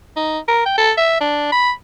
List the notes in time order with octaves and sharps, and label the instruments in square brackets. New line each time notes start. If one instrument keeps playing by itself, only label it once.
[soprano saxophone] D#4
A#4
G5
A4
E5
D4
B5